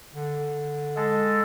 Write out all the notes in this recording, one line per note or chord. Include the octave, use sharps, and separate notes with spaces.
D3
G#3 A4